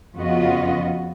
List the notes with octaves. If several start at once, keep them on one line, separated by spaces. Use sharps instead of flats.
F2 C#3 B3 F4 F#4 D#5